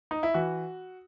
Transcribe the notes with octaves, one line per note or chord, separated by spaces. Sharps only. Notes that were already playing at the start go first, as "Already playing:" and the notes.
D#4
E4
E3 F#4